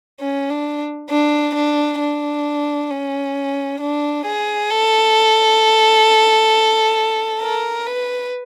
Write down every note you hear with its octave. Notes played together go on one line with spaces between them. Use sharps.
C#4
D4
D4
D4
D4
C#4
D4
G#4
A4
A#4
B4